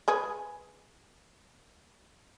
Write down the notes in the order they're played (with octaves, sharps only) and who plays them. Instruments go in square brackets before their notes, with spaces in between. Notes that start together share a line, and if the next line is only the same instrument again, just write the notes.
[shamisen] G#3 G#4 B4